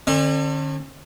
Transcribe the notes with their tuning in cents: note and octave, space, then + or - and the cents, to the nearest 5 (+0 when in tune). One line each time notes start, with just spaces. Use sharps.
D3 +30 C#4 -40